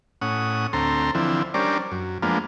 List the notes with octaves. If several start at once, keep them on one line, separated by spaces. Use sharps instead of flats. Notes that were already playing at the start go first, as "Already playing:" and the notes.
A2 C#4 F#5 D#6
D2 C4 A4 A#5 C6
D3 E3 F3 C4 E4
G3 C#4 D4 A#4 C5 D5
F#2
F3 G#3 A#3 B3 D4 F4